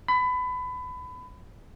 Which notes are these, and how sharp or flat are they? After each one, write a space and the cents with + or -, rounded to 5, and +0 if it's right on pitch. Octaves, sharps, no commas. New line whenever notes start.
B5 +25